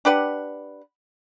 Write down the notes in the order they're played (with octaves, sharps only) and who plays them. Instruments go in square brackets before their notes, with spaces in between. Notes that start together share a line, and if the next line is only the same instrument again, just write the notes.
[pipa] D4 G4 B4 F#5